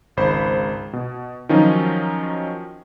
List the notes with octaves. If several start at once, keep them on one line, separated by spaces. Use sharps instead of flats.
G#1 C#2 C5 B5
B2
D#3 F3 F#3 C#4 D#4 F4